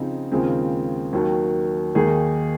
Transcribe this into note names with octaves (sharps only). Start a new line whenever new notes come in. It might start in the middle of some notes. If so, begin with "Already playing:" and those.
Already playing: C#3 F3 C4 D#4 G#4
D#2 C#3 F3 G#3 C4
D#2 D#3 F#3
D#2 D#3 A#3 D#4 G#4